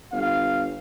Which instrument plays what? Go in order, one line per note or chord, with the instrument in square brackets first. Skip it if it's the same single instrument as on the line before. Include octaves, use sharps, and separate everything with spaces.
[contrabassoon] G1 [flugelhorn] F5